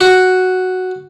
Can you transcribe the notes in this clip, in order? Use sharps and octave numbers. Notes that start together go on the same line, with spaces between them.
F#4